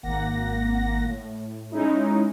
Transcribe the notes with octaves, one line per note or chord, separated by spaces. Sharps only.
G#1 A#3 F#5 A#6
A2
G#3 C#4 D#4 E4